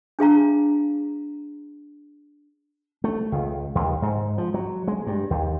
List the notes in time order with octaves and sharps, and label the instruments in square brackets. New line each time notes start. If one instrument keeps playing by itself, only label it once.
[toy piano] D4 G#4 F5 A#5
[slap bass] A3
C#2
D#2
G#2
F3
F#3
G#3
G2
D#2